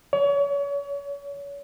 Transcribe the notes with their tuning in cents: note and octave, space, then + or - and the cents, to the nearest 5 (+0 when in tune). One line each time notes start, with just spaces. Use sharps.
C#5 +35